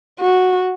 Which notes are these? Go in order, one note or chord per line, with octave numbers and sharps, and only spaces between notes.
F#4